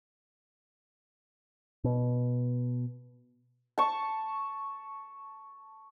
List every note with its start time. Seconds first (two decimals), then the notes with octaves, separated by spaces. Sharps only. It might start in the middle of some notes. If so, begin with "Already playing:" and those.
1.84 B2
3.78 A5 C#6